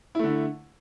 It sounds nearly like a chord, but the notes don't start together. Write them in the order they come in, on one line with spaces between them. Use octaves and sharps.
E4 A3 D3